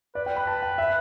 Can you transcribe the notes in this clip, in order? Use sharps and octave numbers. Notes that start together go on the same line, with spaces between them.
B4 D5
G5
B5
A5
G5
E5